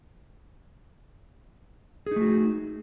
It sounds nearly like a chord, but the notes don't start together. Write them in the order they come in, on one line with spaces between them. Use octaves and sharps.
G#4 D#4 A3 F#4